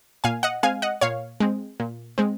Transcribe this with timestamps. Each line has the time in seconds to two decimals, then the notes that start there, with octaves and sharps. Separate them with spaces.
0.24 A#2 F5 G#5
0.43 D#5 F#5
0.63 G#3 C4 F5 G#5
0.82 D#5 F#5
1.01 A#2 C#5 F5
1.40 G#3 C4
1.80 A#2
2.18 G#3 C4